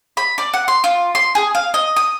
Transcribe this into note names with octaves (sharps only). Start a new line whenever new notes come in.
B5
D5
F#5
C6
F4
C6
G#4
F5
D#5
D#6